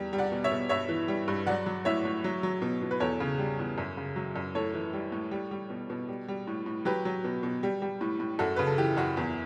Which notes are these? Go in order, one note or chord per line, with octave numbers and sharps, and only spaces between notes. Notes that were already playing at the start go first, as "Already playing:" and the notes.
Already playing: E2 G3
G3
D5 F#5
B2
C#5 E5
B2
G2 C#5 E5
E3
G3
G2
F#3 D5 F#5
F#3
A2 C#5 E5
A2
F#3
F#3
B2
B2
B4
E2 A4 C#5
C#3
G3
E2
F#2
C#3
F#3
F#2
A2 A4 C#5
E3
G3
A2
G3
G3
B2
B2
G3
G3
A2
A2
F#3 G4 B4
F#3
B2
B2
G3
G3
A2
A2
F#2 F#4 A4
C#3 B4
A4
E3 G4
F#2 F#4
E2